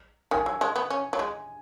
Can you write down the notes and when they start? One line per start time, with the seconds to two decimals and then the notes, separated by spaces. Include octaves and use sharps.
0.31 D#3 G#5
0.46 F#3
0.61 G#3
0.76 B3
0.90 C#4
1.13 F#3
1.19 G#3